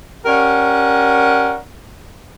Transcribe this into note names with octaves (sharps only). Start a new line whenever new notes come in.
C#4 G4 A#4 D5 F#5